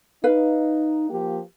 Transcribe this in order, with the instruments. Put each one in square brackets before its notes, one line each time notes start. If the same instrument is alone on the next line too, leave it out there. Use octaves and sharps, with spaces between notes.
[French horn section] D#4 [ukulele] B4 F5
[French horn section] F3 A#3 G4